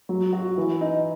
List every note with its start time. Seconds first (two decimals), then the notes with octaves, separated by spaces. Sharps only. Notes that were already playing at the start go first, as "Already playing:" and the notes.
0.09 F#3
0.33 F#4
0.58 E3
0.81 D#4